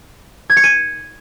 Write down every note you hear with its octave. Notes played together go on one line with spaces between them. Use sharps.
G#6
C#7
D#7